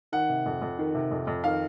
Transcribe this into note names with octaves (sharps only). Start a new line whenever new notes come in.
D#3 F#5
C3
F2
F2
D#3
C3
F2
F2
D#3 F5